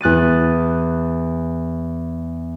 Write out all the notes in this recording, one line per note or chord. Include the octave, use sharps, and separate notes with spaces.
E2 F#6 A6 D#7